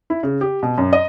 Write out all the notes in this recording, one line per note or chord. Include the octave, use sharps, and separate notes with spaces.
E4
C#3
G4
B2
F#2
D#5